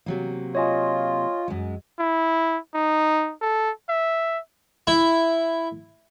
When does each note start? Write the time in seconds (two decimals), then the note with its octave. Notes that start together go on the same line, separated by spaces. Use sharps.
0.06 C3 F#3 A#3
0.55 F4 C#5 D#5 G#5
1.48 F#2 G#3
1.99 E4
2.75 D#4
3.42 A4
3.89 E5
4.87 E4